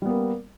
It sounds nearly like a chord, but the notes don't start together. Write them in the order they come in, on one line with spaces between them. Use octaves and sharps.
G3 B3 A#3